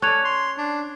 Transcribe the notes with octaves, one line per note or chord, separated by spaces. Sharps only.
C#4 A4 D5 F#6 G#6 F7
C6
D4